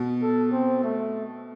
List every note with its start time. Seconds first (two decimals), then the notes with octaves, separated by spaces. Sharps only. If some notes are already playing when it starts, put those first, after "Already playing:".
Already playing: B2
0.22 A4
0.52 C4
0.83 A3